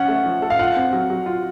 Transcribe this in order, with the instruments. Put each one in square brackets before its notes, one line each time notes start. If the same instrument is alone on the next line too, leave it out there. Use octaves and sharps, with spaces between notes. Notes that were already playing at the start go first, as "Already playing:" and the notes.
Already playing: [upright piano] C#4 [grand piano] F#5
[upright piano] A3
F3
A4
[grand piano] F5
[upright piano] F4 [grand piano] F#5
[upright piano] C4
F#3
F#3
F4